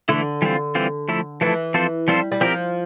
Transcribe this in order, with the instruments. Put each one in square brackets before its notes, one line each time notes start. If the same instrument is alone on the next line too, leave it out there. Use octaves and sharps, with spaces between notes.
[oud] D3 [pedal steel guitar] E3 A3 E4
[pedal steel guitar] E3 G3 C4 F4
E3 G3 C4 F4
F3 A3 E4 A4
[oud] E3 [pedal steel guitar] F3 A3 E4 A4
[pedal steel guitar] F3 C4 F4 A4 C5
[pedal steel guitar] F3 C4 F4 A4 C5 [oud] G3
[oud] G3
[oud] F3 [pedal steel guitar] C4 G4 A#4